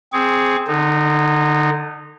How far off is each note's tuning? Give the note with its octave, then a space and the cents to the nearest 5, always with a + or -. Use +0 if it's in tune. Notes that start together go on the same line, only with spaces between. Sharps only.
C4 +0 G#4 +0 C#6 +25
D3 +20 D#4 -15